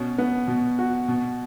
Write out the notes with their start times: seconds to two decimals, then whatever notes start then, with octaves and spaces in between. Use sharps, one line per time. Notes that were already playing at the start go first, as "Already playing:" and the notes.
Already playing: B2 C#4
0.18 B3
0.48 B2
0.79 F#4
1.08 B2